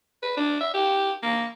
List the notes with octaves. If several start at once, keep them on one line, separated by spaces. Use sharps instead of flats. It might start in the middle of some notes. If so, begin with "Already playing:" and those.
B4
D4
E5
G4
A#3